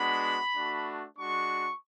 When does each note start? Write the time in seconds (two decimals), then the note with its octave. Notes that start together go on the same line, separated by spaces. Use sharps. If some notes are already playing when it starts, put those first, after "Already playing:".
Already playing: G#3 B3 D4 F#4 B5
0.54 A3 D4 F#4
1.18 G#3 D4 F#4 C#6